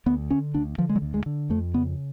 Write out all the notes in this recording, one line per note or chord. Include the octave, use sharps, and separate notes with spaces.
D2 B3
D3 C#4
D2 D4
D3 F3
G#3
F#3
D2
G#3
D3
F2 A3
C#3 B3